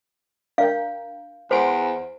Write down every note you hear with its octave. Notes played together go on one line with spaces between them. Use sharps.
D4 A#4 F5 G5
E2 C5 B5 C6 D7